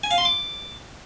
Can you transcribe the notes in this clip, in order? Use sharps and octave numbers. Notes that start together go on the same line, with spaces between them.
G#5
F5
C6
D6